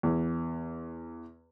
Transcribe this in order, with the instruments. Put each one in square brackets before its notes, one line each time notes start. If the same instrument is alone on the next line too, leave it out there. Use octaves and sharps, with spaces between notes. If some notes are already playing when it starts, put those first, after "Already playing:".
[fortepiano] E2